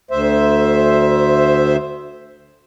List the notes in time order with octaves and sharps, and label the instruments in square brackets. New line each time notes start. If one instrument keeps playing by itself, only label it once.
[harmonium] D2 C5 E5